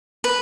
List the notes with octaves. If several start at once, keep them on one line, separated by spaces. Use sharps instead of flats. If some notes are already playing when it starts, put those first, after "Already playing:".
B4